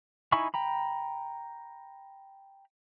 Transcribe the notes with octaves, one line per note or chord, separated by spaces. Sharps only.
D#4 E4 G#5 B5 C#6
G5 A#5 B5